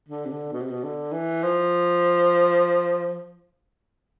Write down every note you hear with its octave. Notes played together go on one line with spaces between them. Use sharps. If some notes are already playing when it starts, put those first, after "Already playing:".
D3
C3
D3
B2
C3
B2
D3
E3
F3